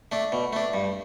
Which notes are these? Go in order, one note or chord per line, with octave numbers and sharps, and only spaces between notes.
A3 D4
B2
A3 D4
G2